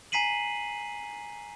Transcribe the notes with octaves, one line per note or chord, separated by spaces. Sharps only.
G#5 A#5 B6 C7 D#7 F#7